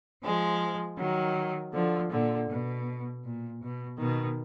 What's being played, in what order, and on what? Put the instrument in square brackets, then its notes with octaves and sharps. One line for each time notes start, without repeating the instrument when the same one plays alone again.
[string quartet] F3 G#3
D#3 F#3
D3 F3
A#2 D3
B2
A#2
B2
B2 D#3